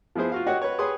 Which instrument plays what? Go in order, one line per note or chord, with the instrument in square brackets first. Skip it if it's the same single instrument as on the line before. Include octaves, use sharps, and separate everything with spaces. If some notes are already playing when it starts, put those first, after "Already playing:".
[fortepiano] F3 B3 E4 G#4 C5
F4 F#4 F5
F#4 G4 C#5 D#5 F#5 G5
B4 C#5
G4 G#4 B4 C#5 C6 D#6